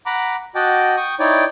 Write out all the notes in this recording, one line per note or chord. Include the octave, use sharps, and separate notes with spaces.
F#5 A#5 B5 D6
F#4 D#5 F#5 G5 A5 D6
G5 C#6 D#6
D#4 E4 C#5 D5 G5 D6